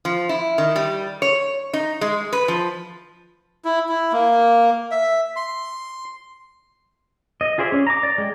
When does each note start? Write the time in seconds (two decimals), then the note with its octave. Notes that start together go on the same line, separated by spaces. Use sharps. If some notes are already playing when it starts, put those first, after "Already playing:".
0.05 F3
0.29 E4
0.58 D#3
0.76 G3
1.22 C#5
1.73 D#4
2.01 G#3
2.33 B4
2.48 F3
3.65 E4
3.89 E4
4.12 A#3
4.91 E5
5.36 C6
7.41 D#5
7.58 F4 G#4 C5 D5 E5
7.72 C#4
7.87 A#5 D6
8.03 D5
8.18 G#3 G5